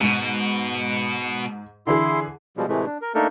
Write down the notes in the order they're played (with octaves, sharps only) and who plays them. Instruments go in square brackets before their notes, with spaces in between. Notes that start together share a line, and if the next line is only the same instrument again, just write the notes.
[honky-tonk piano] G#2 [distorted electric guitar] B2
[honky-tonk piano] D3 E3 G#4 [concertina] E4 C6
[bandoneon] B2 F3 G3 G#3
A2 C3 E3 G#3 A3
D4
A#4
A3 A#3 D4 D#4 A4 A#4